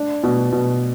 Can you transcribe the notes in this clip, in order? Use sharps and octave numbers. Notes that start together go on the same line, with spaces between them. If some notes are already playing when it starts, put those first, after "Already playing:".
Already playing: D4
B2
B2